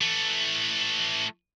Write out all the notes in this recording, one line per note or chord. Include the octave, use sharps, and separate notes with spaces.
E3 A3